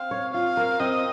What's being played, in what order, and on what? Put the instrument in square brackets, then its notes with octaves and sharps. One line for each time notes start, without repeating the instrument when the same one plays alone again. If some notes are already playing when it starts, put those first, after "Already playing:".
Already playing: [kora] C4 [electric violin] F5
[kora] C#5
[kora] F4 [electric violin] F5
[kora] A#4
[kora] C4 [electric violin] D#5